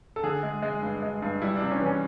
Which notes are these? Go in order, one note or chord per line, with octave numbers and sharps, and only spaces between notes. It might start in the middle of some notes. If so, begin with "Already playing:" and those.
A4
D3 G#4
G#3
G#3
G2
G#3
G2
G3 E4
C3 D4
C#4
E3 C#4